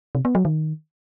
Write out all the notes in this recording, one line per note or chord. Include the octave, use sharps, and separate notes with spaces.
C3
B3
F#3
D#3